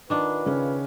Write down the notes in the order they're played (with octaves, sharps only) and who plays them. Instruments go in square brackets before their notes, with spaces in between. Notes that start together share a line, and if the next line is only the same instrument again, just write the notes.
[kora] D#3 D4 [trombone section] F4 B4
[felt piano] C#3 C#4